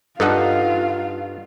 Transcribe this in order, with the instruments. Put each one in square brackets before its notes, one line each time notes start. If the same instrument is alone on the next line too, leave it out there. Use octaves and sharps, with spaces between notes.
[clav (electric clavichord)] G2 F#5 [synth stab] D#4 A4 [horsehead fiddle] F4 F5